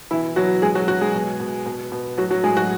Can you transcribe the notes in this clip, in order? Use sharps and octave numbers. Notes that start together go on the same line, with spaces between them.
B2 E3 E4
B2 F#3 F#4
B2 G#3 G#4
F#3 F#4
B2 F#3 F#4
G#3 G#4
B2
B2
B2
B2
A2 F#3 F#4
F#3 F#4
A2 G#3 G#4
F#3 F#4